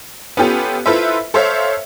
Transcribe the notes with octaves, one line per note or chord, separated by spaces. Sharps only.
B3 C#4 F4 G4 A4
E4 F4 A4 B4 C5 E5
A4 C5 C#5 E5 F5